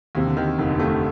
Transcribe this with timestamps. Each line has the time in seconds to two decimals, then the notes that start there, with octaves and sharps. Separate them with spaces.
0.15 D#2 C3
0.26 D3
0.36 C3 D#3
0.47 C3
0.59 F1 D#3
0.69 D3
0.78 C3 A3
0.87 D3